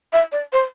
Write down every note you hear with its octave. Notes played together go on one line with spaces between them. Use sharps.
E5
D5
C5